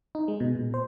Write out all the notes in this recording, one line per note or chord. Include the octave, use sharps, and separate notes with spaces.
D#4
G#3
B2
A#2
C5